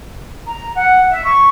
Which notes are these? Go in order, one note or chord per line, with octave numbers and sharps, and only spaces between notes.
A#5
F#5
E5
C#6